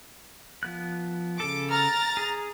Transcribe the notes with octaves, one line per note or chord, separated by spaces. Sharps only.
F3 B3 F#6
C#3 A4 D6
A#5 F6 A6
G#4